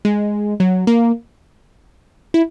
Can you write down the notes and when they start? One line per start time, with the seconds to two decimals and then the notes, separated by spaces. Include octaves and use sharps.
0.05 G#3
0.60 F#3
0.87 A#3
2.34 E4